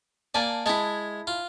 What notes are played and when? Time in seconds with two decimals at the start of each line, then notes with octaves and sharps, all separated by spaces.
0.34 A#3 D5 G#5 A5
0.66 G#3 E4 G#4 A5
1.27 F4